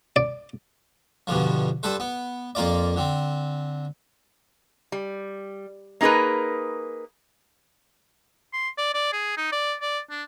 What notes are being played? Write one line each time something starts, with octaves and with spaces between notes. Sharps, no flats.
D5
G2 B2 D3 F3
G2 A4 B4 C5
B3
F2 A#3 F4 D5
D3 C4
G3
A#3 D#4 G#4 A#4 B4
C6
D5
D5
G#4
D#4
D5
D5
D4